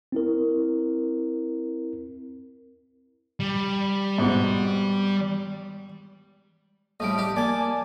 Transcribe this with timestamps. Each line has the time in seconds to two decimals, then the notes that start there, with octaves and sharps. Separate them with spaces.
0.12 C4 E4 A#4
3.40 G3
4.18 G#2 B2
7.00 A2 F3 G3 D#5 D7
7.18 D4 G4
7.36 A#3 D5 G#5 A5 D6